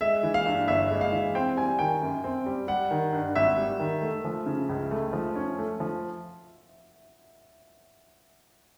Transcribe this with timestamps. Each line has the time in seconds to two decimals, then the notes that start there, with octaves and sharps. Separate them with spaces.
0.01 G#3 E5
0.23 E3
0.34 F5
0.46 G2
0.68 G1 E5
0.90 G#3
1.01 F5
1.12 E3
1.35 C4 G5
1.57 G3 G#5
1.79 D#3 G5
2.02 F#2
2.24 C4
2.46 G3
2.68 G3 F#5
2.91 D#3
3.13 G2
3.35 G#1 E5
3.57 G3
3.80 D#3
4.02 A3
4.25 F3
4.46 C#3
4.69 C#2
4.91 A3
5.13 F3
5.35 C#4
5.58 A3
5.80 F3